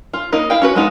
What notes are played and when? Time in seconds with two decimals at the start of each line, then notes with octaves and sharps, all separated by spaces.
0.13 F4
0.32 A#3 D#4 F4 D#5
0.50 E4 F5 G5
0.62 C#4 F#4 B4
0.75 G#3 B3 D#4 F4